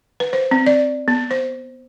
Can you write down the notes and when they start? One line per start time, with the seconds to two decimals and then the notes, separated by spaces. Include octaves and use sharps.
0.20 B4
0.33 C5
0.51 C4
0.66 D5
1.08 B3
1.31 C5